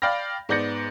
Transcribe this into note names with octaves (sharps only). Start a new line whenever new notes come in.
D5 F5 G5 B5 F6 A#6
G#2 B3 D5 G6 A#6 C#7